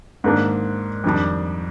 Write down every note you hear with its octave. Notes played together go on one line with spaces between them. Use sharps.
G#2 D#3 A#3 D4
F2 D#3 G3 D4